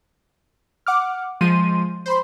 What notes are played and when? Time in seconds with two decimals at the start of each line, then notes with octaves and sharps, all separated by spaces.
0.86 F#5 D6 F6
1.41 F3 G#3 C6 D#7
2.06 C5 B5 C6